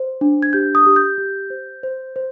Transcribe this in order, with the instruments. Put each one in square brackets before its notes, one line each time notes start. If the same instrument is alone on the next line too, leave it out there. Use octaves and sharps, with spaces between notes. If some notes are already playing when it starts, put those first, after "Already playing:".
Already playing: [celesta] C5
D4
G#6
G4 G6
D#6
G4
G6
G4
C5
C5
C5